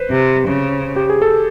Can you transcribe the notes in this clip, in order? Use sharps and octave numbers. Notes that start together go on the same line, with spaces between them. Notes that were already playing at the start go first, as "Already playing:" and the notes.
Already playing: B4 C5
C3
C#3
G4
G#4
A4